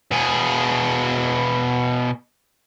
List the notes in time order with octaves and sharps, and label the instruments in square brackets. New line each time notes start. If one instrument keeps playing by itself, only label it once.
[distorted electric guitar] B2 G#4